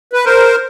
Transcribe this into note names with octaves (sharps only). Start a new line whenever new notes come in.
B4
A#4 C5